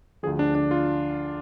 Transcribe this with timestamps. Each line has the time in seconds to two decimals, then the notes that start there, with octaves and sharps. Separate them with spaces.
0.23 D2 D3 F3 G#4
0.39 D4
0.55 D4
0.71 F4